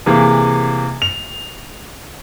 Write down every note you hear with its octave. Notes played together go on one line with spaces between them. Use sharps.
C3 E3 A#3 G#4
F7